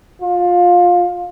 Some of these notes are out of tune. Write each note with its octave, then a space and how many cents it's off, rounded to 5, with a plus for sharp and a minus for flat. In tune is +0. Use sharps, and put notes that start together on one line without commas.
F4 +20